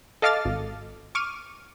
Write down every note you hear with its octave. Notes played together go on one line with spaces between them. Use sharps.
A4 D#5 F5 D6 F6 A6
G#1
C#6 D6 F6 D#7